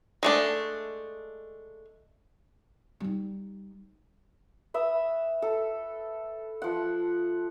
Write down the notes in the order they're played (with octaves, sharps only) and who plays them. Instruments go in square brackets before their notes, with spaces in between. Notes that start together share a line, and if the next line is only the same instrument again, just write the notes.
[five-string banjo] G#3 A3 D4
[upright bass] G3 D#4
[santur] B4 E5 D#6
A4
F3 F#5